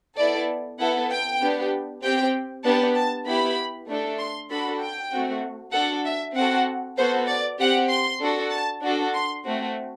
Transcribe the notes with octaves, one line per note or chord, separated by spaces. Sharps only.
B3 E4 A4 D5
B3 E4 A4 F#5
G5
B3 D4 G4
C4 G4 G5
B3 D4 G4 A5
A5
B3 E4 G4 B5
A3 D4 A4
C6
D4 F#4 A4 B5
G5
A3 C4 F#4
D4 F#4 A4 F#5
E5
C4 F#4 A4 F#5
B3 F#4 A4 C5
D5
C4 G4 F#5
C6
D4 F#4 A4
A5
D4 F#4 A4
C6
A3 C4 F#4